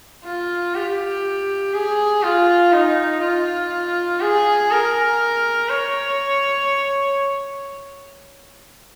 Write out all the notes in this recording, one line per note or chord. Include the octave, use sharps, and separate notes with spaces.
F4
G4
G#4
F4
D#4
F4
G#4
A#4
C#5